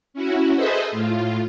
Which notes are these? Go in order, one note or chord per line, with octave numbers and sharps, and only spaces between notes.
C#4 E4 F#4
G#4 A4 B4 C5 D#5 E5
A2 F4